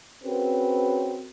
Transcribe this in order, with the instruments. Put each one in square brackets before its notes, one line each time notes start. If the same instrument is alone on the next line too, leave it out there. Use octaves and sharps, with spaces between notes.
[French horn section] C4 C#4 F#4 G#4 A#4 B4